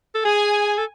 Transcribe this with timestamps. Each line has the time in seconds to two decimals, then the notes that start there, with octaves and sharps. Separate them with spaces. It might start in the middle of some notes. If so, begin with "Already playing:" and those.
0.15 A4
0.25 G#4 G#5
0.78 A4